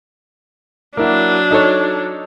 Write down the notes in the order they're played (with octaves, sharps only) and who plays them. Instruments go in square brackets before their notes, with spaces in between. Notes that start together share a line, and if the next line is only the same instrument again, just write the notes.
[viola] F#3 D4 [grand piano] A#3 E4 F#4
[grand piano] D#4 A4 C#5